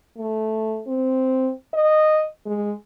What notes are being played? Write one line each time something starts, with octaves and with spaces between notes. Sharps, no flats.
A3
C4
D#5
G#3